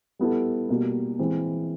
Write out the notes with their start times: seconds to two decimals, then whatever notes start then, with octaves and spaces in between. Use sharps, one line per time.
0.19 G3 B3 E4 A4
0.69 B2 G3 A#3
1.19 E3 G#3 C4